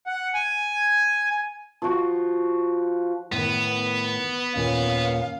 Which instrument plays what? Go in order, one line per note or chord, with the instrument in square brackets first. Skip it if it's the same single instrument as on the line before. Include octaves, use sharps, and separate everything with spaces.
[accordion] F#5
G#5
[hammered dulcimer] F3 F#4
[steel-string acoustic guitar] A2 D#3 [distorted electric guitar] B3
[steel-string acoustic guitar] D#2 A#2 A#3 [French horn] C#4 [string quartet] F5